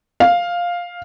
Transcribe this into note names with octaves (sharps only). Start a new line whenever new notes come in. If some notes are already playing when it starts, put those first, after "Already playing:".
F5